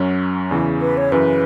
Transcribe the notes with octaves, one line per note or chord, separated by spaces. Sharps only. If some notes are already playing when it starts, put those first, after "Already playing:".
Already playing: F#2 F#3 C#4
E2 C#3 E3
B4
C#5
F#2 C#3 E3 B4